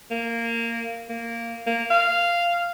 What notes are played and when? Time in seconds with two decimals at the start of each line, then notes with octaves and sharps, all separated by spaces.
0.11 A#3
1.09 A#3
1.67 A#3
1.91 F5